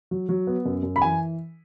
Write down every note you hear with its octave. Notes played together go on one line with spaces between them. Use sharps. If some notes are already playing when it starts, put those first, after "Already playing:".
F#3
F#3
B3
F#2
F#2
B5
E3 G#5